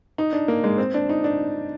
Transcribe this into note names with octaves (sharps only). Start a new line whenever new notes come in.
D#4
D4
A#3
G#3
C4
D4
D#4
D4